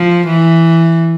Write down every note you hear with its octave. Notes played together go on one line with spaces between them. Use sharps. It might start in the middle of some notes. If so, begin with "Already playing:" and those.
Already playing: F3
E3